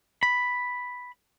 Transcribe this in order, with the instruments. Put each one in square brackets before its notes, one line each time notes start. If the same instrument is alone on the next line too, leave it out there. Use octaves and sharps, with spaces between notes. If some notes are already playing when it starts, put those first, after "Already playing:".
[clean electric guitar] B5